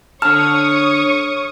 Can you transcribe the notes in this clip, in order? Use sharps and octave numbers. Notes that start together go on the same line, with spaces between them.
D3 C#5 A5 C#6 D#6 F6